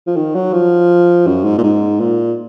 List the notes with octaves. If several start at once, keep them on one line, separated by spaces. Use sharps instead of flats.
F3
D#3
F#3
F3
F#2
G#2
A#2
G#2
A#2